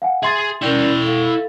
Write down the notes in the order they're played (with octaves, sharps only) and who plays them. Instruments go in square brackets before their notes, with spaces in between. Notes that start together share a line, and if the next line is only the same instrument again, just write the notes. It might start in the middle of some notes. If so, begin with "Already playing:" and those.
[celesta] F5 F#5 G#5
[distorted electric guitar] G#4 [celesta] E5 C6 A6
[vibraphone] C#4 A#4 D5 [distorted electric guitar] E4 G5
[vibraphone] A4 F5